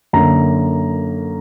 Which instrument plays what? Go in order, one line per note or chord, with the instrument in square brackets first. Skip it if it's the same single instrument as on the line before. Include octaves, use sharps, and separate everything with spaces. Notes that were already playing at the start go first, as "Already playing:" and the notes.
[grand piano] F#2 D3 A#3 A#5